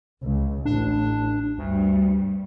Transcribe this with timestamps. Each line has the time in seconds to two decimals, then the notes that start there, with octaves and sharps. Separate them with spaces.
0.23 C#2
0.65 A1 D4
1.58 D2 G2